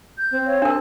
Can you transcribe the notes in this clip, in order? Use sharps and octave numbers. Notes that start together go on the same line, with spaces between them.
G6
C4
C#5 F5
D4 A#4 A5